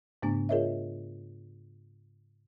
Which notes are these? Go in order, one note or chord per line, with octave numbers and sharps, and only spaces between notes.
G#2 C#3 A3 B3 D4
F4 G#4 A#4 C#5 D#5 E5